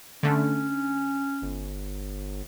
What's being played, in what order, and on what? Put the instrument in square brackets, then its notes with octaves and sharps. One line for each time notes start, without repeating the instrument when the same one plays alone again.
[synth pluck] D3 A3 [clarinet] C#4
[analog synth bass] G1